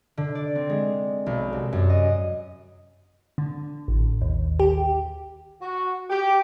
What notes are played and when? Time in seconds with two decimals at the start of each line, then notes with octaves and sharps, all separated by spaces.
0.17 D3
0.35 D5
0.55 C4
0.70 G#3
1.26 B1
1.53 C2
1.73 F#2
1.90 D#5
3.38 D3
3.88 A1
4.21 D#2
4.59 G4
5.61 F#4
6.10 G4